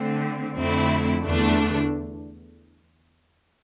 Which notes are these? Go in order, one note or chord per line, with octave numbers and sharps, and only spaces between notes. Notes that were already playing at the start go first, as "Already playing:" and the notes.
Already playing: D3 A3 C4
F2 D3 A3 C4 E4
E2 D3 A3 D4